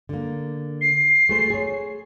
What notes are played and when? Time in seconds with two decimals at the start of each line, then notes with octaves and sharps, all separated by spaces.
0.09 D3 A#3
0.81 C7
1.29 A3 G#4 C5
1.50 G#4 C#5